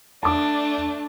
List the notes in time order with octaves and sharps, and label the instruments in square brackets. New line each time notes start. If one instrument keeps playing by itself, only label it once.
[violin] A3 D4 [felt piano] A5 D6